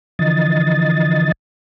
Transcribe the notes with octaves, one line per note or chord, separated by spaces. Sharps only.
D3 E3 F3 D#5 A6